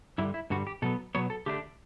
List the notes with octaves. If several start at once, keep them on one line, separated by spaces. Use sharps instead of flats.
G2 D3 G3 E4
E4
G2 D3 G3 F#4
G4
B2 F#3 B3 A4
B2 F#3 B3 C#5
A4
D3 A3 D4 G4